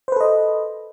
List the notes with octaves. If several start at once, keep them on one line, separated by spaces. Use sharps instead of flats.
A4 B4 C5 D#5